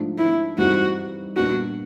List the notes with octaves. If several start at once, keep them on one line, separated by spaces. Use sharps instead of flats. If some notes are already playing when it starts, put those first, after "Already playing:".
Already playing: G#2 F3 A3 D4
E4
G2 E3 G3 C4 D#4 F#4
A#2 G3 B3 D4 F#4